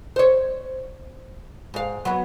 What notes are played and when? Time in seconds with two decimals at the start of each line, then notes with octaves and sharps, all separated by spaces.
0.16 C5 C#5
1.74 G#2 F5
2.05 F#3 B3